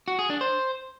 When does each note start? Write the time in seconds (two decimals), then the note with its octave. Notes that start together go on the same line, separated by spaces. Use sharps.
0.08 F#4
0.19 G#4
0.30 D4
0.41 C5